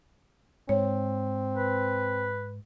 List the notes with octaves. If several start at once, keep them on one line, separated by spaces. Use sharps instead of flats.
G#2 C4 C#5
B4